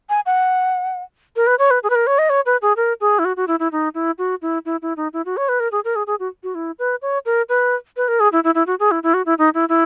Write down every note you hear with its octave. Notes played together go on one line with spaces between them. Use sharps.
G#5
F#5
A#4
B4
C#5
B4
G#4
B4
A#4
C#5
D#5
C#5
B4
G#4
A#4
G#4
E4
F#4
F#4
E4
E4
D#4
E4
F#4
E4
E4
E4
D#4
E4
F#4
C#5
B4
A#4
G#4
A#4
G#4
G#4
F#4
F#4
E4
B4
C#5
A#4
B4
B4
A#4
G#4
E4
E4
E4
F#4
G#4
E4
E4
F#4
E4
D#4
E4
E4